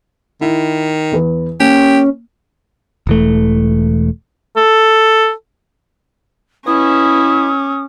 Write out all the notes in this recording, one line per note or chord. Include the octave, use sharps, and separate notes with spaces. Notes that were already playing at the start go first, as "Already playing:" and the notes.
D#3 E4
E2 B4
A#3 C#4 G4
E1 E3 A3
A4
B2 E3 C#4 E4 D#6